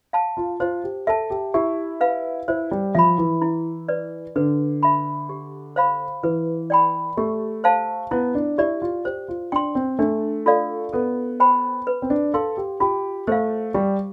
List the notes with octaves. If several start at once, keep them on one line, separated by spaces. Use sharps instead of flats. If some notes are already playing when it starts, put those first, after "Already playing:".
F5 A5
F4
F4 C5
G4
A4 E5 A5
G4
E4 G4
B4 F5
E4 C5
G3
F3 E5 B5
E3
E4
B4 D5
D3 B4
E5 B5
G4
C5 F5 B5
E3 B4
D5 G5 B5
A3 G4
C5 F5 A5
B3 E4
D4
E4 G4 D5
F4
G4 C5
F4
D4 G5 C6
C4
A3 D4
F4 A4 D5 F5
B3 A4
C5 G5 B5
B4
C4
D4
A4 F5 C6
G4
F4 G4
A3 C5 F5
G3 G4